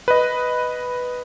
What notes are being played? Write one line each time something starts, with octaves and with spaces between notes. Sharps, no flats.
B4 D#5